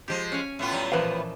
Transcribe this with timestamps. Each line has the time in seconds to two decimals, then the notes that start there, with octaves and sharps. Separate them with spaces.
0.08 F3 G#3 G4
0.32 C#4 F5 G#5
0.59 A2 B3 F4
0.72 F#3 G3
0.92 A#2 E3 F3 B4 C5 F5